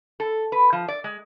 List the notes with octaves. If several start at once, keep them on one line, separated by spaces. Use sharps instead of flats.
A4
B4
F3
D5
G#3